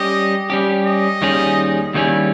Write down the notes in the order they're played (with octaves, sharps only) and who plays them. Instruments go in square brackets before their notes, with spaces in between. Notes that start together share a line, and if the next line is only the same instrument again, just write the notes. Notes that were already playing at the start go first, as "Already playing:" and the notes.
Already playing: [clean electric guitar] G3 C#4 G4 [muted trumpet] D#5
[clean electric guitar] G3 C#4 G4
[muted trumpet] D#5
[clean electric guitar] D#2 D#3 G3 C#4 G#4
[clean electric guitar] D#2 D#3 G3 C#4 G#4 [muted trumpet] E4